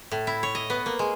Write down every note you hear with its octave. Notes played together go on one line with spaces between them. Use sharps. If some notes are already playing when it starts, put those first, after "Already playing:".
A2
E4
C#5
D#5
B3
A#3
G#3